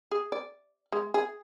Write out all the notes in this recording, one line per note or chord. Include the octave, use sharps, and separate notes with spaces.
G#4
D5
G#3
G#4